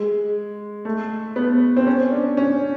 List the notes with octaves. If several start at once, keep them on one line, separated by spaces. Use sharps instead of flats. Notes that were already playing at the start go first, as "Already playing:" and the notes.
Already playing: G#3
A3
B3
C4
C#4
D4
C#4